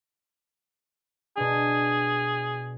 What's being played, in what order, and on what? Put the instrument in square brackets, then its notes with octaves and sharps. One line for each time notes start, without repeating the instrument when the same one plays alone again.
[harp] B2 D4 [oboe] G#4